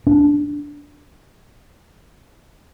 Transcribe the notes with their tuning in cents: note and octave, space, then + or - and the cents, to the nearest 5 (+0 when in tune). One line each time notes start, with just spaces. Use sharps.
D4 -10